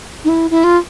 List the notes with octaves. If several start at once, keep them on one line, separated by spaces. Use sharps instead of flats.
D#4
E4
E4
F4